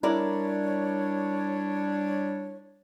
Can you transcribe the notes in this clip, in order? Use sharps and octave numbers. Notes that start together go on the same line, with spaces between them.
G3 D4 E4 A#4 C#5 D5